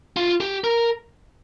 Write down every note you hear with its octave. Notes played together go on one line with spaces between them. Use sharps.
F4
G4
A#4